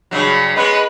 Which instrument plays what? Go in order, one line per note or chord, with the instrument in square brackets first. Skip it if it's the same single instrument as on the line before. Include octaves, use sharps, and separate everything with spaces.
[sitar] G2 C#3 F#3
[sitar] G#3 B3 C#4 [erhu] B4